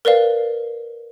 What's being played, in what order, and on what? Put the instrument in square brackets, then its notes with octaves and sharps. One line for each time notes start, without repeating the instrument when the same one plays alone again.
[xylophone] A#4 B4 D5 F5